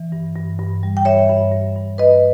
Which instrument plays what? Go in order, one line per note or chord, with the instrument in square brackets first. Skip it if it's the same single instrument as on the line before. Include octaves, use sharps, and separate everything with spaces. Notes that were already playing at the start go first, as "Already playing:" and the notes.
Already playing: [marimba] E3
G2
G2
G2
G3
G5
G2 C#5 E5
G2
G2
G2
G2 B4 D#5